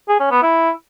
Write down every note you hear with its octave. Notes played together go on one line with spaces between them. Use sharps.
G#4
C#4
B3
E4